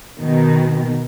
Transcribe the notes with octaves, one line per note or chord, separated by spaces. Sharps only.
B2 D#3